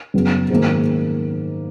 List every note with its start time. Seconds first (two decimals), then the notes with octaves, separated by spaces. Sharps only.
0.14 F#2 C#3 F#3 B3
0.50 G#2 D#3 A#3